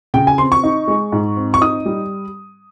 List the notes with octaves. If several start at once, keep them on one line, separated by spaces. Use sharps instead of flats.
C#3 G5
G#5
C4 C6
C#6
D#4
G#3
G#2
C4
C#6
D#4 D#6
G3